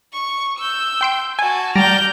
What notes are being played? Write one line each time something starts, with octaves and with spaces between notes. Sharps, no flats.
C#6
E6 G6
G5 C6 D7
F#4 G#5 A5
G3 D5 A#5 F6 G6